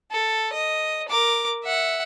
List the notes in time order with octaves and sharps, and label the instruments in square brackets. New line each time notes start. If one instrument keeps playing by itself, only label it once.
[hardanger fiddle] A4
D#5
A#4 D6
E5 F#5